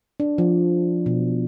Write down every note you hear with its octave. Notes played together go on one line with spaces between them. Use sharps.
D4
F3
B2